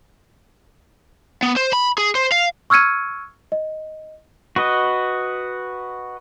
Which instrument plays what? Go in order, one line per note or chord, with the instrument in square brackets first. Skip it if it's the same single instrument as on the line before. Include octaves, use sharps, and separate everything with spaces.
[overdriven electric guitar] B3
C5
B5
G#4
C5
F5
[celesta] C#6 E6 F6 G#6 C#7 D#7
D#5
[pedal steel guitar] F#4 B4 D#5